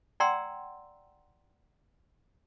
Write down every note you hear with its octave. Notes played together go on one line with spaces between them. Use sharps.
D5 F#5 G5 A#5 C6 E6